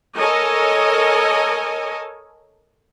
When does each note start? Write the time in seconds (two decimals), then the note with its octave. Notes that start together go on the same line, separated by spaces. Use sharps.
0.18 A4 A#4 C#5 D#5 G#5